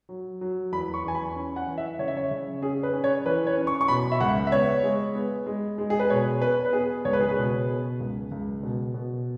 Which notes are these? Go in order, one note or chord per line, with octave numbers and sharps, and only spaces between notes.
F#3
F#3
E2 B5
C#6
E2 G#5
B5
C#4
F#5
E3
E5
C#3 C#5
E5
C#5
C#3
C#4 G#4
B4
C#4
C#5
E3 B4
C#5
C#4
C#6
C#6
B2 B5
E5
C#2 F#5
E5
B3 C#5
G#3
B3
G#3
G#3
G#4
B4
B2 C#5
B3 B4
B4
B3 G#4
C#2 C#5
B4
G#4
B4
B2
B2
C#2
C#2
B2
B2